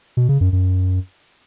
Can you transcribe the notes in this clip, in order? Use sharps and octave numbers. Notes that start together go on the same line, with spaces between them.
B2
C#3
F#2
F#2